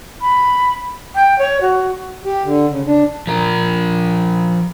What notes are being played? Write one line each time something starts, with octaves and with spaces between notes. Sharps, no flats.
B5
G5
C#5
F#4
G4
D3
C#3
D4
F3 A#4